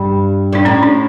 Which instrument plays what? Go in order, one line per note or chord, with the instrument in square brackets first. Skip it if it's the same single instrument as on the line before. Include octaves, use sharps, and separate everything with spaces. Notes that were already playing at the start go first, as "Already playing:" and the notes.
Already playing: [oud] G2
[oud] G2 [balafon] D4
[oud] A2 [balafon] C#4
[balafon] D4